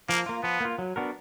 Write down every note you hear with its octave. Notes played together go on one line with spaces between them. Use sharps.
F3 A#3
A#3 F4
F3 B3
A#3 F4
F#3
B3 D4 F#4 A#4